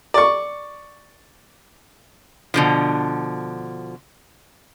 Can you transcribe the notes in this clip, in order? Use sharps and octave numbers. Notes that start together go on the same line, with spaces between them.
D5 C#6
B2 D3 F3